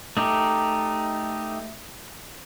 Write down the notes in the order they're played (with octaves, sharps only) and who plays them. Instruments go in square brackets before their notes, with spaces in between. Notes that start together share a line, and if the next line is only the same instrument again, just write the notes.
[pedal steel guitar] A3 D#4 G4